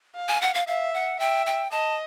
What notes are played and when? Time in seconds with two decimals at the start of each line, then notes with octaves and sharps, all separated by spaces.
0.15 F5
0.29 G#5
0.42 F#5
0.54 F5
0.68 E5 F5
0.94 F#5
1.19 E5 G5
1.46 G5
1.71 D#5 A5